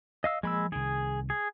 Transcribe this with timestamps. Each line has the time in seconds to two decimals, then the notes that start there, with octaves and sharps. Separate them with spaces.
0.24 D#5 F5 E6
0.43 F3 G#3 A#3 B5 E6
0.72 C2 D#3 G#4
1.30 G#4